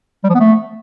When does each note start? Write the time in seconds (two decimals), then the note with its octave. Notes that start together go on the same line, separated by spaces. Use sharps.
0.24 G3
0.29 F3
0.35 B3
0.40 A3